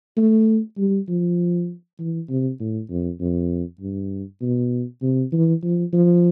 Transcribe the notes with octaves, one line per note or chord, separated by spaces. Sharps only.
A3
G3
F3
E3
C3
A2
F2
F2
G2
B2
C3
E3
F3
F3